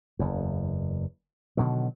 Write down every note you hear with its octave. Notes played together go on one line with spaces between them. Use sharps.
F#1 E2
B2 D3 D#3 F#3